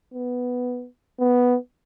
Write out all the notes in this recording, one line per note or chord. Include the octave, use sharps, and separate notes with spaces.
B3
B3